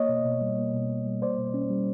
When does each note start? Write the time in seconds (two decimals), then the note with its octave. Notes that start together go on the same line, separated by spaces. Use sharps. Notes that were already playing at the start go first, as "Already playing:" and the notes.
Already playing: A#3 C#5 D#5
0.09 B2
0.25 B2
0.41 G3
0.58 A#3
0.74 B2
0.90 B2
1.07 G3
1.22 A#3 C5 D5
1.38 B2
1.54 C#4
1.70 G3